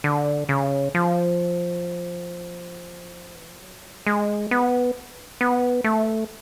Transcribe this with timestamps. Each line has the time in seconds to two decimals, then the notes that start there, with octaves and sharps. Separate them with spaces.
0.04 D3
0.49 C#3
0.95 F3
3.35 E3
3.48 F3
3.61 F#3
4.07 G#3
4.51 B3
5.41 B3
5.84 A3